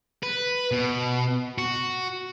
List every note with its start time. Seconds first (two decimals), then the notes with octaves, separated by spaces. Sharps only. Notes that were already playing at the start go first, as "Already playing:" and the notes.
0.23 B4
0.72 B2
1.58 F#4